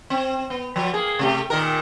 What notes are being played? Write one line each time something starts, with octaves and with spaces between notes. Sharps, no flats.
C4
B3
F3 F#3
A#3 G#4
C3 A3 G4
A#2 D#3 A#4